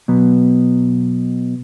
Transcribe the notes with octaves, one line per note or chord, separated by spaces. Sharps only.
B2 F#3 B3